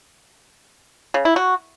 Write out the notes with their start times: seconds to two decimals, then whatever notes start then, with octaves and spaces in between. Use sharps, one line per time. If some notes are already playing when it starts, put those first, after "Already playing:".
1.14 C#3
1.25 E4
1.36 F#4